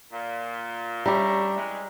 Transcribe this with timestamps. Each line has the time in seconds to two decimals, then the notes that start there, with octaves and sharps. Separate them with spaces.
0.13 A#2
1.06 G3 A3 C#4 D4 G4 A#5
1.57 E3 G#3